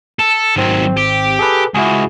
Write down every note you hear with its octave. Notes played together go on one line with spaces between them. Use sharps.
A4
G#1 D#3 F#3 C4
G4
G#4 A4 B4
C#2 E4 F#4 G#4